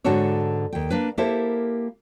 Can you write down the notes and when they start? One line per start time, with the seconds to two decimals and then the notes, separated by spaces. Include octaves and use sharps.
0.04 G#2 D3 D4 F#4 A4 C#5
0.72 D#2 G5
0.90 A#3 D4 B4
1.18 A#3 E4 G4 A4 A#4 C5